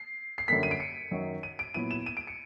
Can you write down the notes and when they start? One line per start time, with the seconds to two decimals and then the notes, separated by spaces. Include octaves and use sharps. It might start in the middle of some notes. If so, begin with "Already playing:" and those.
Already playing: C7
0.38 C7
0.48 F#2 D3 G3 A#3 B6
0.63 D#7
0.71 D7
0.80 C#7
1.11 F#2 D#3 F#3
1.43 D#7
1.59 D7
1.74 A#2 F#3 B3 E4 D#7
1.91 E7
2.06 D#7
2.17 D7
2.27 C#7